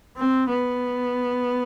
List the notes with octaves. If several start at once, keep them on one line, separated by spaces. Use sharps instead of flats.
C4
B3